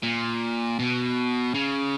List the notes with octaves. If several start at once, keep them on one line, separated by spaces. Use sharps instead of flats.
A#2
B2
C#3